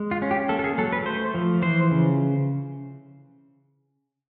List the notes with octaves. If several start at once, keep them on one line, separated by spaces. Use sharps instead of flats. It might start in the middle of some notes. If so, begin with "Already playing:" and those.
Already playing: G#3
F4
C#4
G4
A#3 A4
A4
G#4
F#3 A4
B4
A3 C5
F3
E3 C5
C#3